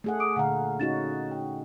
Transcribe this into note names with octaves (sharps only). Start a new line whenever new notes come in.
A3 G#4 F#5
D6 D#6 D7
A#2 D3 F5 F#5 A#5
C#4 D#4 F#4 A6 E7
G5